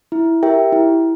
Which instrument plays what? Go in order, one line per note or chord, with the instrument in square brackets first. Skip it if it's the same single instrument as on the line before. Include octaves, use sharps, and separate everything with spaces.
[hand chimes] E4
G4 A#4 E5 G5
E4